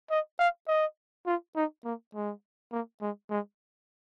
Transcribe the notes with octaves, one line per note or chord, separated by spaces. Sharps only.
D#5
F5
D#5
F4
D#4
A#3
G#3
A#3
G#3
G#3